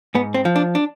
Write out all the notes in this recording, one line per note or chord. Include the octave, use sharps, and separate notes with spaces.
G#2 B3
C4
F3
D4
D4